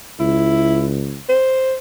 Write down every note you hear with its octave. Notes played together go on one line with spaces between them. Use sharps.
C#2 E4
C5